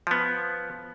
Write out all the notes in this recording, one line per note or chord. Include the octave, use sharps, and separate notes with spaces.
F3 B3